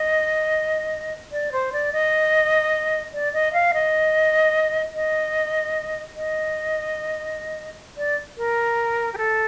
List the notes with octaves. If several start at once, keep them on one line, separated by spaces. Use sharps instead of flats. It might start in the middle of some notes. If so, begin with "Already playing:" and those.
Already playing: D#5
D5
C5
D5
D#5
D5
D#5
F5
D#5
D#5
D#5
D5
A#4
G4
A4